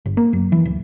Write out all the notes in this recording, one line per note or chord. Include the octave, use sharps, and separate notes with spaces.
G1
A#3
F#2
E3
D1